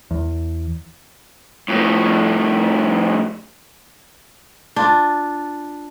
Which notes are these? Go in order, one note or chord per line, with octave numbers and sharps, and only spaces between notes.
E2
F2 A2
D4 F4